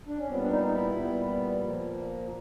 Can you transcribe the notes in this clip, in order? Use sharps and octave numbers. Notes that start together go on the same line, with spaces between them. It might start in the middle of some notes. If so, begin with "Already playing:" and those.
D4
C#4
A#2 G3 B3 C4
D4
D#4
D#4
E4
A#2 G3 B3
A#2 F3 A#3